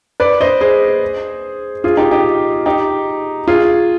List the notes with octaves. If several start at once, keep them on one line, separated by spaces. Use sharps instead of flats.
B4 D5
C5 D#5
G#4 C5
F4 G#4
D#4 G4
D#4 G4
D#4 G4
F4 G#4